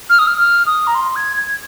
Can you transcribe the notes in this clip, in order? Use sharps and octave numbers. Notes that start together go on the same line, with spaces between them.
F6
D#6
F6
F6
D#6
A#5
C6
G#6
G#6